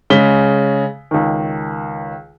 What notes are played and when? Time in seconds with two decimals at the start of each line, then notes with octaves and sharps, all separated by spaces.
0.10 C#3 G#3 B6 G7
1.11 C#2 D#3